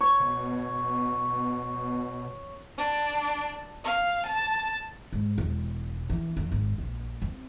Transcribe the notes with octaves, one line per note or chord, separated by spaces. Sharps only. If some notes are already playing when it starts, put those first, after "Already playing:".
C#5
B2
D4
F5
A5
G#2
E1
E3
F2
G#1
A#1
C4